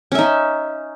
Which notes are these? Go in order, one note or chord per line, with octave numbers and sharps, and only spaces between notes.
C#4 D#4 E5